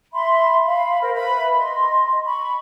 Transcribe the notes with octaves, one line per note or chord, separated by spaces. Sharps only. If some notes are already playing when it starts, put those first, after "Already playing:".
E5 B5 C6
F5 B5
A#4 C5
B4 E5 B5
D#5 C6
B5 C#6